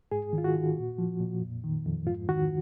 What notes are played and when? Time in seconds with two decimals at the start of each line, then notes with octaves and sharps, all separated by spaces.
0.11 G#2 G#4
0.33 D#3
0.38 F4
0.44 F#4
0.55 D#3
0.77 A#2
0.98 F3
1.20 A#2
1.41 F2
1.64 D#3
1.85 F2
2.07 G#2 F4
2.29 D#3 F#4